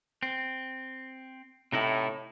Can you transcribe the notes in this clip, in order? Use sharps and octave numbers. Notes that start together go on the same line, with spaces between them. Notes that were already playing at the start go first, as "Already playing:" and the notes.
C4
A2 C3 D#4 E4